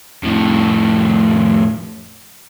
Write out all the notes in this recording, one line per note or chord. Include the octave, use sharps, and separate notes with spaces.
F2 A2